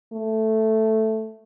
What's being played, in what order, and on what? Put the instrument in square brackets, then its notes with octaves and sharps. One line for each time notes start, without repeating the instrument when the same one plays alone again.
[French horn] A3